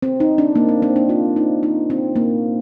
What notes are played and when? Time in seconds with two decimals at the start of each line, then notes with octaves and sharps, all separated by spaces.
0.02 C4
0.20 D#4
0.38 D4
0.55 A#3
0.69 C4
0.82 C4
0.96 D4
1.09 F4
1.36 D#4
1.63 D#4
1.90 C4
2.16 A#3